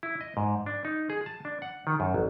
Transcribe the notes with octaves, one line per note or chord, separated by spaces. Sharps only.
E4
D#5
G#2
D4
D#4
G#4
A5
D4
F#5
D#3
F#2
A1